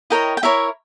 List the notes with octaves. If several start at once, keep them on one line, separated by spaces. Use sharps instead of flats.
E4 A#4 C#5 D#5 G5
G5
E4 A#4 C#5 E5